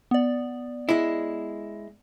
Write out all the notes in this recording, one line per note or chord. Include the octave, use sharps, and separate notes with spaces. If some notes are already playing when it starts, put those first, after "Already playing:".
B3 D5
G#3 E4